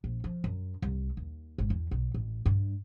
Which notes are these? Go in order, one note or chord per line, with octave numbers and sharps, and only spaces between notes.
A#1
F3
F#2
C2
D#2
G#1
E2
B1
A1
G2